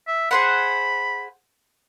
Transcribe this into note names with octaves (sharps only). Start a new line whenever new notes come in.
E5
G#4 C5 F#5 B5